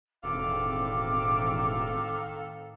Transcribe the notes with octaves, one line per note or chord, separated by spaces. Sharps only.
E1 A2 D#3 C4 A4 F5 D6